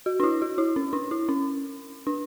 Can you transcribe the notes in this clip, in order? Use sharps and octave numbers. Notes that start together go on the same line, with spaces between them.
F#4
D4
E4
F#4
E4
C#4
D4
E4
C#4
D4